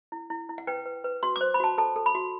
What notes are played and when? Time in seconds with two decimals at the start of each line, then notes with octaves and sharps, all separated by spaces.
0.12 E4
0.30 E4
0.49 E4
0.58 F#5
0.67 B4 G5
0.86 B4
1.04 B4
1.23 F#4 C6
1.36 D6
1.41 C5
1.54 B5
1.60 F#4 A5
1.78 A4 A5
1.96 A4
2.06 B5
2.15 F#4